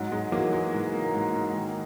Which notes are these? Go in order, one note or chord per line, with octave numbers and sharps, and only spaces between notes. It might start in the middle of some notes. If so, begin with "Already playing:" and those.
Already playing: G#2 F#3
G#2 G#3
E3 F#3 A#3
E3 G#3
G#2
A#3
G#2
G#2
D#3